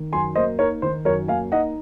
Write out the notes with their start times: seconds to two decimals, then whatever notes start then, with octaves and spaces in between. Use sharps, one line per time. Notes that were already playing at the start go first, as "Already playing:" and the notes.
Already playing: D#3
0.13 F#2 G#5 C6
0.35 A#3 C5 D#5
0.59 D#4 A#4 C#5
0.82 D#3 C5
1.05 F#2 A#4 C#5
1.28 A#3 F5 G#5
1.52 D#4 D#5 F#5